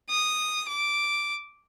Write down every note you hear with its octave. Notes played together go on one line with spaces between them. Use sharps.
D#6
D6